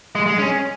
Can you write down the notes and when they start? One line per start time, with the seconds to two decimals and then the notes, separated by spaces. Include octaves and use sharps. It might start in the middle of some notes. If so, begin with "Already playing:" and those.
0.15 G#3
0.26 G#3
0.38 C#4